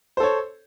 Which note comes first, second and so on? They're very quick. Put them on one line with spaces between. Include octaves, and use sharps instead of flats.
C5 A4 C#5